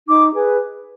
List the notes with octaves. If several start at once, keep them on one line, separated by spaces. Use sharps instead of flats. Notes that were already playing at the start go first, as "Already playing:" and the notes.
D#4 D6
G#4 B4